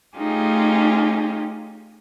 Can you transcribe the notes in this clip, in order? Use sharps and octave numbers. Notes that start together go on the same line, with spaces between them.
A3 C#4 D#4 F4 G4 G#4